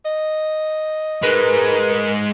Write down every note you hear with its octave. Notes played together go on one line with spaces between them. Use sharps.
D#5
G#3 D#4 A#4 B4